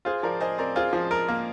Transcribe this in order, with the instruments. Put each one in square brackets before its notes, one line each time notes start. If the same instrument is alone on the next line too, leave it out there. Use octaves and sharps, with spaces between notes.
[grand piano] F4 [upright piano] G#4 C5
[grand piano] F3 [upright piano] A#4 D5
[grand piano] G#4 [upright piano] C5 D#5
[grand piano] C4 [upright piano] A#4 D5
[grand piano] F4 [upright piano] G#4 C5
[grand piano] F3
A#4
A#3